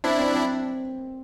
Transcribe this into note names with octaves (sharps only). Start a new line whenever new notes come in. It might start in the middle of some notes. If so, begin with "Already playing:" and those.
C4 D4 E4 C5
C4 C5
C4 C5